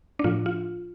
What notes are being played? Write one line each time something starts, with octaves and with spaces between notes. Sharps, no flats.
D4
A2 F3 F4
F4